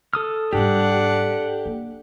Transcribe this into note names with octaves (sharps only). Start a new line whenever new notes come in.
A4 D#6 F6
G#2 G3 D4 G4 F#5
A#3